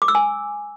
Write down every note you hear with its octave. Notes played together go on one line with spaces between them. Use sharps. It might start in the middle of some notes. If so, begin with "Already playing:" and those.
D6
E6
G#5